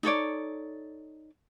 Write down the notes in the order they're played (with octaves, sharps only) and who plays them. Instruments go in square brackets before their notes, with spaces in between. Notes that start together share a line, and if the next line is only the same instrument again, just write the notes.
[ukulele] D#4 A4 C#5 D5